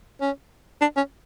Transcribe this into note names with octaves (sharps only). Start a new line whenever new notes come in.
C#4
D4
C#4